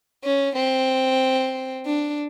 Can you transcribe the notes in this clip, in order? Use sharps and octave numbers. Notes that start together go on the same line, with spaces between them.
C#4
C4
D4